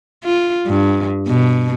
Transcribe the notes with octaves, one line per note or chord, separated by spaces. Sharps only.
F4
G2
B2